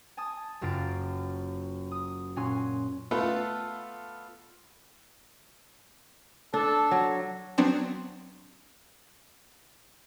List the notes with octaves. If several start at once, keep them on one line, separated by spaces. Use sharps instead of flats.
G#5 A5 D#6
F#1 F#2 F4 A6 D7
D#6
A#2 C#4 F#4 G#5 C6 C#6
A3 B3 F4 A4 B4
D4 A4
F#3
F#3 B3 C4 D4